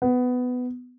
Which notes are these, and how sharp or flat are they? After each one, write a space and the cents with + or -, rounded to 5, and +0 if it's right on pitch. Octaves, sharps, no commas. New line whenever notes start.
B3 +15